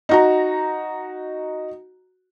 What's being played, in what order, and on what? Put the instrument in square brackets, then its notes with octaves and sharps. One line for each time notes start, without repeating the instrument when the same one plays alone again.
[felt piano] D#4 F#4 A#5